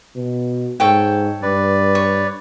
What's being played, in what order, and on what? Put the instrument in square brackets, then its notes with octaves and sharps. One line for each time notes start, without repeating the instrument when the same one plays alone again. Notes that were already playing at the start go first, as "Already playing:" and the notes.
[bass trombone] B2
[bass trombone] G#2 [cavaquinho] A4 C#5 G5
[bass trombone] G2 [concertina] B4 D5
[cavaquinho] C#5